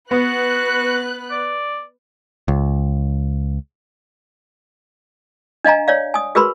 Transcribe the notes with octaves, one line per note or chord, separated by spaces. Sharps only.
B3 F#4 B4 F#6
D5
C#2
D4 D#5 F5 G#5 A#5
C#5 D5 F5
G#5 D#6
F#4 G#4 A#4 B4 B5 C6